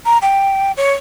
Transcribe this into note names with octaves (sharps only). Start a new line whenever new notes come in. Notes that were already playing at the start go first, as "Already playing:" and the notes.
A#5
G5
C#5